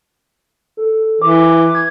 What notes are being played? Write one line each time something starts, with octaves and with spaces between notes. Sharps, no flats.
A4
E3 D6
G#6